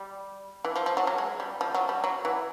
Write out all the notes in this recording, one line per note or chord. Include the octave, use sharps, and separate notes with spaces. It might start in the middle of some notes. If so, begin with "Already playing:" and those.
Already playing: G3
E3
F3
F3
F#3
F#3
G#3
G3
F3
F#3
G3
F#3
E3